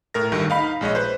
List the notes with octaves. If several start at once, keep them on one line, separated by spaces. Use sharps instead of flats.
A2 A#4 A#6
D2 G2 D#3
D#4 F5 B5
A#1 G#3 C#5 D#5
B4 C5